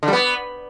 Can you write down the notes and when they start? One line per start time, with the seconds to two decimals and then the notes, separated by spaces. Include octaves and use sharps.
0.03 D3
0.08 G3
0.13 B3